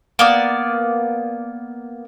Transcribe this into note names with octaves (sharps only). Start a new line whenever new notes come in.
A#3 B3 D5